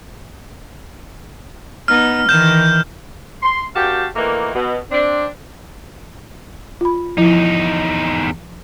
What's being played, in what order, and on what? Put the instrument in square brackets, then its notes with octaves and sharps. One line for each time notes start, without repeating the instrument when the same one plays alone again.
[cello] B3 D#4 [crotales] F6
[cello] D#3 E3 [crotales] G6 E7
[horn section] C6
F#2 F#4 G4 F5 G5 A5
A#2 D#3 E3 A3 A#3
B2
C4 D4
[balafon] F4 B5
[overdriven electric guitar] E2 D#4 [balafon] F3 E4